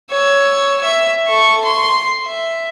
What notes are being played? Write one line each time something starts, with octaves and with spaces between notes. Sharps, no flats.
C#5 E6
E5 E6
A4 C#6
C6
E5